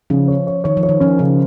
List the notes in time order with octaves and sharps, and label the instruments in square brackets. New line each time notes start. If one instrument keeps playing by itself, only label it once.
[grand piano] C#3 [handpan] F3
[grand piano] C#5
C#5
[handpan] D#3 [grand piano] C#5
[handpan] F3
[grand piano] C#5
[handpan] D#3
[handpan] F3 [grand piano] C#4
[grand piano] C#3 [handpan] F3